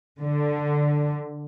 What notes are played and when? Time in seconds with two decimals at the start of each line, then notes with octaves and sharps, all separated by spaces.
0.22 D3